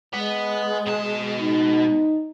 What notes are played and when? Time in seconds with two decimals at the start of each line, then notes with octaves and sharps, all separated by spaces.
0.14 G#3 B3
0.86 B2 A5
1.40 D#4